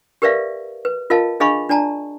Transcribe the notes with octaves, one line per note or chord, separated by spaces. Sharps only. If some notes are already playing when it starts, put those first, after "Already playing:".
G4 A#4 B4 D5 E5 F5
B4
F4 A#4 D#5 F5 A5
D4 G#4 D#5 F5 B5 C#6
D4 D5 A5 A#5